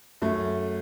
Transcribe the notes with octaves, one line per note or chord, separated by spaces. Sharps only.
F#2 A3